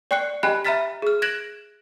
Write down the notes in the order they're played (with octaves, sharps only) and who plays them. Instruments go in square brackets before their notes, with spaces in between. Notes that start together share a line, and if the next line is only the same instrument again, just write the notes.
[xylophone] D5 G5 C#6 F#6 C7 C#7
G4 D#5 G5 G#5 B5 F#6
E5 A#5 B5 F6 A6 B6
G#4 F6
F#6 G#6 A#6 D7 E7 F#7